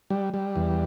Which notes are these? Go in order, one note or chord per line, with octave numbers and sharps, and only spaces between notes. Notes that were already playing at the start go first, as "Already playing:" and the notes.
G3
G3
E2